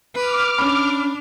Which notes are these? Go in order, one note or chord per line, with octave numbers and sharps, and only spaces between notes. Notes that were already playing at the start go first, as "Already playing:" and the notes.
B4 D6 F6
C#4 D4 B5